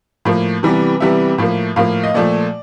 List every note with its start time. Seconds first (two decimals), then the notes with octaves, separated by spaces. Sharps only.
0.25 A2 F3 A#3
0.63 C3 E3 G3 B3
1.00 C3 E3 G3 B3 E5
1.38 A2 F3 A#3
1.76 A2 F3 A#3 F5
2.04 D#5
2.14 A#2 F3 A3 D5